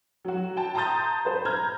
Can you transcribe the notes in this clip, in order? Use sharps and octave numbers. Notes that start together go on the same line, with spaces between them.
F#3 F#4
G5 A5
A5 A#5 C6 D#6 G6 A6
B4 C5
A#5 F6 G6 G#6